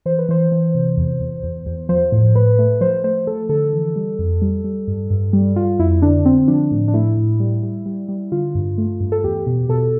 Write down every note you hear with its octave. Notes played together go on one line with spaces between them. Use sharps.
E3 C5
B4
E3 C5
E3
C3
E2
E2
E2
E2
F3 C5
A2
A2 B4
A3
F3 C5
A3 C5
F3 A4
D3 A4
E3
G3
F2
G3
G3
G2
G2
G3
G3 F4
F2 E4
D3 D4
D3 C4
F3 D4
A2
D4
A3 E4
A2
G3
G3
G3
G3
D3 F4
G2
A3
G2
A4
E2 G4
B2
B2 A4